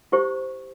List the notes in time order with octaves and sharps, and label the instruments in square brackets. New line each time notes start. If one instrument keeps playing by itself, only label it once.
[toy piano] E4 G4 C5 C#6